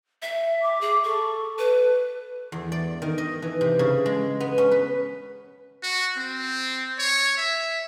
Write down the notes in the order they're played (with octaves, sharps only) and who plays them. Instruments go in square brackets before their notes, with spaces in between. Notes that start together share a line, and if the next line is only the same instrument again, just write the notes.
[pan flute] E5
[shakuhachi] D6
[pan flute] G#4
[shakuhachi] A4 [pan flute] C#6
[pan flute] B4
[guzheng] E2
D5
D#3
D#5
E3
C3
C#3
G#3
B3
C#4
B4
[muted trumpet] F#4
C4
C#5
E5